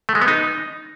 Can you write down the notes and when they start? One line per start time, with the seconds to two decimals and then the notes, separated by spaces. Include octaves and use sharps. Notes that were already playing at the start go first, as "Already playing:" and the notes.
0.09 A3
0.15 G#3
0.22 B3
0.28 D#4